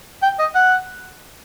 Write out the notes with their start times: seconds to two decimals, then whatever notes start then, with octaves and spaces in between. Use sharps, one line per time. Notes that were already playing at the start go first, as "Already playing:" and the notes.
0.23 G5
0.39 D#5
0.55 F#5